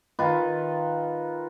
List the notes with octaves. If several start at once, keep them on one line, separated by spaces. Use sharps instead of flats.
D#3 F4 B4